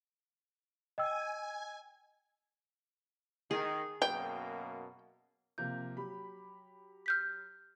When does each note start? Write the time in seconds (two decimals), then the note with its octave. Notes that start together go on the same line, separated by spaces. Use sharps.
0.98 D#5 G5 G#5 E6
3.51 D#3 G#4
4.02 F#2 B2 A#3 G5
5.58 C3 F3 A#3 G6
5.97 F#3 G4 B5
7.06 F6 G6 B6